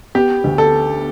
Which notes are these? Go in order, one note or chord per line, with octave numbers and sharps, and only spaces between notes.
B3 G4
D2
A4